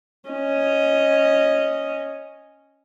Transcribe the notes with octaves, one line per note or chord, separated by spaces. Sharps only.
C#4 D#5